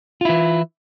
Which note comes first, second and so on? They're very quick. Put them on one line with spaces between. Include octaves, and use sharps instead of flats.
F4 E4 E3